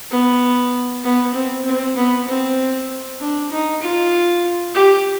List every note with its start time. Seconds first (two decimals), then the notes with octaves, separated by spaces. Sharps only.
0.11 B3
1.04 B3
1.34 C4
1.65 C4
1.96 B3
2.28 C4
3.20 D4
3.51 D#4
3.82 F4
4.75 G4